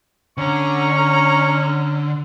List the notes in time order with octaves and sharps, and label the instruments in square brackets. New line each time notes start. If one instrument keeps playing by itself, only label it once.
[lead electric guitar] D3 [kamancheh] C#4 A#5 [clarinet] C#6